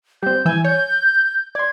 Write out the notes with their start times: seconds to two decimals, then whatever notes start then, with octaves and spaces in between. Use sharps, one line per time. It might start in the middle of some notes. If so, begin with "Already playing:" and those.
0.23 G3 C4 G6
0.45 E3 G#5 E6 G6
0.65 C#5 G6
1.55 D5 C6 G#6